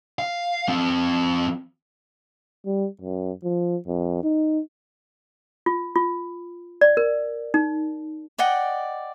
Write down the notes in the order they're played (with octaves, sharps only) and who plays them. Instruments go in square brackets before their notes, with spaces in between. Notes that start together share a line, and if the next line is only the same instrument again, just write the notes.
[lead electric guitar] F5
F3 C4
[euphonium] G3
F#2
F3
F2
D#4
[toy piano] F4
F4
D5
A#4
D#4
[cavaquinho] D5 D#5 F#5 G5